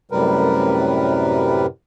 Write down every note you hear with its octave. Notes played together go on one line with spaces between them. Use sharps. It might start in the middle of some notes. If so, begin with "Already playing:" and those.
F#2 A2 C3 G3 A#4 B4